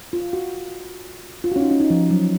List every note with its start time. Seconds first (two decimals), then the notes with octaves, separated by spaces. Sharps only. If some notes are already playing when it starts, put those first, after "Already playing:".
0.13 F4
0.33 F#4
1.44 F4
1.52 F#4
1.56 C#4
1.61 D#4
1.71 C#4
1.80 D#4
1.90 F3
2.11 F#3